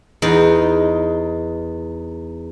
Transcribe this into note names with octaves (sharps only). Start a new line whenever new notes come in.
E2 D#4